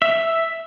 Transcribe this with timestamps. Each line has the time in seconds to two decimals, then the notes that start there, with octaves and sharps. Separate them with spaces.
0.02 E5